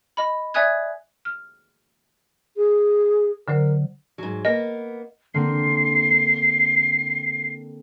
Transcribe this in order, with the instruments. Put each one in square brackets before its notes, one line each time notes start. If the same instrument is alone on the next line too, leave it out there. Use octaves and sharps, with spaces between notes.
[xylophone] D#5 B5
D5 E5 G#5 D#6 F#6 G#6
[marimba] F6
[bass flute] G#4
[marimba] D3 F#3 C5 [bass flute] A#4
[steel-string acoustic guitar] G#2 F#3
[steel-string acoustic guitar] A#3 B3 [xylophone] D#5
[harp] D3 A#3 C4 [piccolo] C7